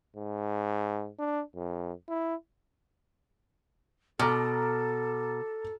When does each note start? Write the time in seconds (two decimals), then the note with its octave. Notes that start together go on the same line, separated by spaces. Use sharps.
0.16 G#2
1.19 D4
1.55 F2
2.08 E4
4.19 B2 A4 A#5 D6 F6